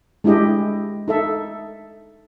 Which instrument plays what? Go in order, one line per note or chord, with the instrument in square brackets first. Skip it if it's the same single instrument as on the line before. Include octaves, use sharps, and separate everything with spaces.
[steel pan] G#3 D4 E4 G4 D#5
D#4 A4 E5